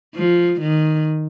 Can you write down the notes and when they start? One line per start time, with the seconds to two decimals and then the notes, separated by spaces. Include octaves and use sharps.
0.15 F3
0.61 D#3